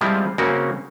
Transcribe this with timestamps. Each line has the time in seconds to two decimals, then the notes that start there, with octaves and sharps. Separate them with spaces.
0.01 F3 G3 G#3 C4 E4 F4
0.38 C#3 A#3 C4 C#4 F#4 A#4